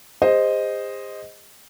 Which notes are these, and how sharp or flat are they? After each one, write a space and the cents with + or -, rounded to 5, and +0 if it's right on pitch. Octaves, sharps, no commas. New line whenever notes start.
G#4 -45 C5 +0 D#5 +0